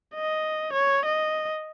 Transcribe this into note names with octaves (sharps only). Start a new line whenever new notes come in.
D#5
C#5
D#5